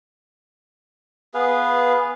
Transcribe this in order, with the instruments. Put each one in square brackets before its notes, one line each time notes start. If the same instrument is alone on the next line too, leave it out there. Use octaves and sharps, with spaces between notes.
[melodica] B3 G#4 B4 F5